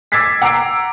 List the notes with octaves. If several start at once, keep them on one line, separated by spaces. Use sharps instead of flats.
D6 E6 G#6 A6 B6 C7
F#5 A#5 D6 E6 C7 D7